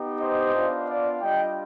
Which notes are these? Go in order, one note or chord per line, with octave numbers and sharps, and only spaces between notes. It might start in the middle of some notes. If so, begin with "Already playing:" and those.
Already playing: B3 D#4 G4
C5 D#5
B3 D4 F4
D5 F5
G3 D4 F4 D#5 G5